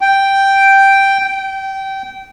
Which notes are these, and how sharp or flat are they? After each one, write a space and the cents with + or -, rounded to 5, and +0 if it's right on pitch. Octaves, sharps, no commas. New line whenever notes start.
G5 +0
G5 -20